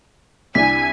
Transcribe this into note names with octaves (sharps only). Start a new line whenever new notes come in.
C2 D4 E4 G#5 B6